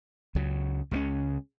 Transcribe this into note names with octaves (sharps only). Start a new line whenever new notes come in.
C#2 C#3 F#3
C#2 C#3 G3 C#4